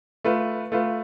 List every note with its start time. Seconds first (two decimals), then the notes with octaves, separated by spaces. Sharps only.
0.24 A3 F4 B4
0.72 A3 F4 B4